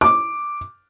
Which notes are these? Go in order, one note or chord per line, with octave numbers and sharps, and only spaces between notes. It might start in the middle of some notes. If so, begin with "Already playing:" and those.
D6